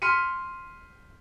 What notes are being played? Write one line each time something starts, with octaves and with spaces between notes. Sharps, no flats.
C6 F6 B6 C#7 D#7